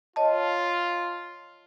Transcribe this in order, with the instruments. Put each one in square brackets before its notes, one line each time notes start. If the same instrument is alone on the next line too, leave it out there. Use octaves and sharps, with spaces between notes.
[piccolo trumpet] F4 [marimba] C#5 D#5 A5